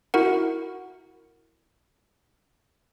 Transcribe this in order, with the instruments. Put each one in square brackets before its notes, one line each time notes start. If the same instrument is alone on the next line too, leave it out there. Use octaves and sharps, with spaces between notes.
[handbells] E4 F#4 A#4 F#5